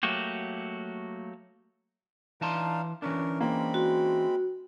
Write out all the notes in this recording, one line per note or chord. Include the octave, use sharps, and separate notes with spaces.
F#3 A3 A#3 F#4 G4
E3 D4 D#4 F5 A5 C6
E3 C#4 D4 A#4
G#3 A#3 C4 B5
F#4